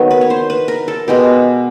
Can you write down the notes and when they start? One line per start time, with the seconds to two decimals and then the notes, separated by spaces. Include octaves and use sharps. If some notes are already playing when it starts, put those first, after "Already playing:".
Already playing: D#3 F#3 B3
0.11 B4
0.21 C#5
0.30 C5
0.50 B4
0.68 A#4
0.88 A4
1.08 B2 G#3 B3 G4